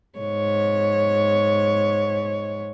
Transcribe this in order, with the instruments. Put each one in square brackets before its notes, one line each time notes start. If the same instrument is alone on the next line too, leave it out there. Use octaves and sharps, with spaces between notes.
[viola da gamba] G#2 C#5